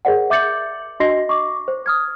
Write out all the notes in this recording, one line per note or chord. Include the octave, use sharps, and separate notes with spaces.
G#4 A#4 C5 D5 F#5
E5 D6 G6 A6 C#7 F#7
D4 F#4 D#5 C6 A#6 C7
C#6 D6
C5
D#6 F6 G#6